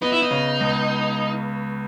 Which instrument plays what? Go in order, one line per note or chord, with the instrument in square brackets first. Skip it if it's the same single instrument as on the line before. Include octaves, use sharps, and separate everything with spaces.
[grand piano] B3 [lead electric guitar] D#4
[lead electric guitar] E4
D#4
[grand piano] C#3
C#2